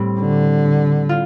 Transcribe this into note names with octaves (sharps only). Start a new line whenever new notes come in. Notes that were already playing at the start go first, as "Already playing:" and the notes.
Already playing: A2 G3 C4
D3
F4